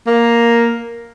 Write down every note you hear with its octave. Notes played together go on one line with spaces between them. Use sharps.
A#3